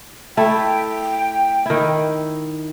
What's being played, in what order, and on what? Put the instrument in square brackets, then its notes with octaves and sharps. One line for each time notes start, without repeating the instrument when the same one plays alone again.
[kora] A3 E4 [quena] G5
[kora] D#3 E4